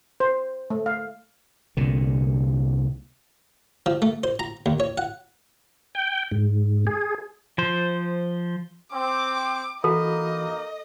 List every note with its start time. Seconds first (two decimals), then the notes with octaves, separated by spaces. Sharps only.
0.20 C5
0.70 A3
0.86 F5
1.77 C2 A#2 D3
3.86 F3
4.02 A3
4.24 C5
4.39 A#5
4.66 D#2
4.80 C#5
4.98 F#5
5.95 G5
6.32 G#2
6.87 G#4
7.58 F3 C5
8.93 C4 D6
9.84 E3 A#3 D#4 F#4 A4 D#5 B5